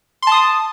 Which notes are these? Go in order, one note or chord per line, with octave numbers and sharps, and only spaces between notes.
A5 C6 D#6